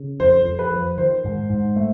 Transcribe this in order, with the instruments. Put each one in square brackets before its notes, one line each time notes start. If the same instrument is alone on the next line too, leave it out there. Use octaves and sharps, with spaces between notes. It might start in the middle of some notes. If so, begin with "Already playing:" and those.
Already playing: [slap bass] C#3
[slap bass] F2 [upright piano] C5
[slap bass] F2
[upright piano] B4
[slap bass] F3
[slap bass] D#3 [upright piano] C5
[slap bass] G#2
G#2
A3